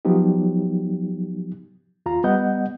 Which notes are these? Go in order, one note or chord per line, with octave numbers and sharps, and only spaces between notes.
F3 F#3 B3 D#4 G4
D#2 F4 A#5
G3 B3 D#5 F#5 G6